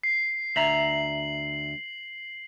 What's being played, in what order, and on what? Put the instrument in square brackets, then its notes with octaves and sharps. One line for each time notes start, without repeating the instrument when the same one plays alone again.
[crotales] C7
[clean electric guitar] D2 E5 A#5 [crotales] F#7